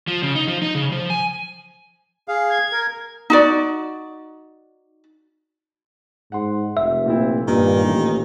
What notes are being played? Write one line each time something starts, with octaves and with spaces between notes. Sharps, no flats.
F3
C#3
D#4
F3
D#4
C#3
F3
G#5
G#4 F5
G#6
A#4
D#4 F#4 D5
G#2 F#5 C6
F1 E5
A#2 C4 E4
G2 A#2 D#3
A1